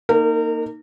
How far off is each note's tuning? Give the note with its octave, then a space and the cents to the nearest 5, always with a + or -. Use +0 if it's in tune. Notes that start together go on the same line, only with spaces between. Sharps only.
A#3 +0 D#4 +0 A#4 -35